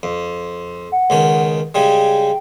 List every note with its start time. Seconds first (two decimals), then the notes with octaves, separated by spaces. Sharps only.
0.03 F2
0.92 F#5
1.10 C#2 D#3 C#4
1.75 C#3 G3 G#3 G5